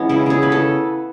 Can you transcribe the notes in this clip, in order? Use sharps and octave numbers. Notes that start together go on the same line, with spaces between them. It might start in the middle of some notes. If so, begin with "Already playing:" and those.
Already playing: E3 G#3 B3 C#4
C#3 E4
C#3 G#4
B3 B4
A4